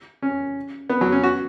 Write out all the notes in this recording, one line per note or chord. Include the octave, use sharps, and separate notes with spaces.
C#4
B3
F#3
C#4
F#4